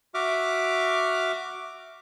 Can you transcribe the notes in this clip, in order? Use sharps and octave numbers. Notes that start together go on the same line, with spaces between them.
F#4 E5 D6 F6